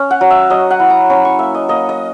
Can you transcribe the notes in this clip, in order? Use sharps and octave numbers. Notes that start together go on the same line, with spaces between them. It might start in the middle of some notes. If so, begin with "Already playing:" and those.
Already playing: C#4
F#5
F#3
E5
F#3 D#5
F#5
E4
A#5
C#4 B5
C#6
A#3 E5
D#5
A#3 D#5
D#5